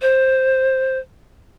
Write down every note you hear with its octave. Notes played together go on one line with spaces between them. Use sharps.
C5